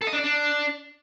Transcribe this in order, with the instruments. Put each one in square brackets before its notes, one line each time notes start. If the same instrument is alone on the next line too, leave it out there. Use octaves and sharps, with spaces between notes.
[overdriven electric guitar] A4
D#5
D4
D5
D4